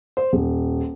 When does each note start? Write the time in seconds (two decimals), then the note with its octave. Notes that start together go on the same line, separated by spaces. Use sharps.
0.17 C5
0.33 D#1